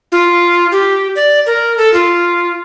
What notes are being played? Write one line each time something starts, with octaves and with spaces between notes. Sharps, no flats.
F4
G4
D5
A#4
A4
F4